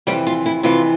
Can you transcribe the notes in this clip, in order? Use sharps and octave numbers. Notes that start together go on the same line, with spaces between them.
F2 C3 E3 G3 G4
F4
E4
F2 C3 E3 F4